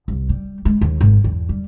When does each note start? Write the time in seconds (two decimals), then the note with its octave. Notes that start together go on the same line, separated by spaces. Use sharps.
0.08 C2
0.29 G3
0.65 G#3
0.81 D#2
1.01 G#1
1.24 E2
1.49 G3